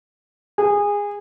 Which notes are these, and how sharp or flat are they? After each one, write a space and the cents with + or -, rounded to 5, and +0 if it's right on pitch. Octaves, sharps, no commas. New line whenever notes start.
G#4 -20